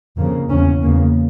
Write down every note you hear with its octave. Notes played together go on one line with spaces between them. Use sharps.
F2 C#3 A#3
E2 C#3 C#4
E2 C#3 A#3